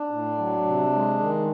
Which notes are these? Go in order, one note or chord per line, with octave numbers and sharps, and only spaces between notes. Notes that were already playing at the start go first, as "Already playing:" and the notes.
Already playing: D4
A2
F#3
C3
G#3
D#3